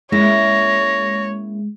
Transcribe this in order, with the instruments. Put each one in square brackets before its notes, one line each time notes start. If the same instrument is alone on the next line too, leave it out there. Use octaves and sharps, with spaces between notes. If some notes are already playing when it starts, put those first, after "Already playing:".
[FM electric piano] G#3 [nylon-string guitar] A#3 C#4 E4 [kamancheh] C#5 [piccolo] A#6